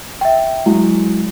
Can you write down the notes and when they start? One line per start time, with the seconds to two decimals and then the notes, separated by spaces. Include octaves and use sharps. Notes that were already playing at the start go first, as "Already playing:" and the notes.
0.21 E5 G5
0.66 F#3 G#3 E4